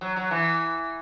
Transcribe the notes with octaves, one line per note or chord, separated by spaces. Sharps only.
F#3
F#3
E3